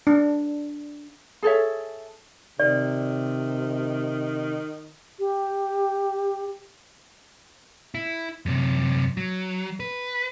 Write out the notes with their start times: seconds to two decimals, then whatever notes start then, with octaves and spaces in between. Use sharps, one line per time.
0.07 D4
1.43 G#4 A4 C#5 E5
2.60 C3 D#3 D5
5.19 G4
7.95 E4
8.46 F#2 C3
9.17 F#3
9.80 B4